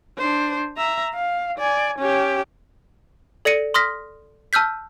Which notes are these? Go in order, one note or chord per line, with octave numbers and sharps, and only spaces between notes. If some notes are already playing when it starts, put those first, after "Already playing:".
D4 C5
E5 A#5
F5
D5 G#5
C#4 G4
A4 D5 A#6 C#7 D#7
C6 D#6 F6 A#6 B6
A5 E6 F6 G6 B6